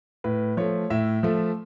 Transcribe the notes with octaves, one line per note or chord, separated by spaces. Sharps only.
A2 B4
F3 A3 C#5
A2 E5
F3 A3